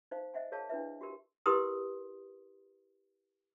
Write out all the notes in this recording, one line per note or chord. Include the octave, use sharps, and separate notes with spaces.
D#4 C5 F5
C5 D#5 E5 F#5 G#5
G#4 A#4 C#5 F5 A5
D4 E4 B4 E5
F#4 G4 A#4
E4 G4 A#4 B4 C6 D#6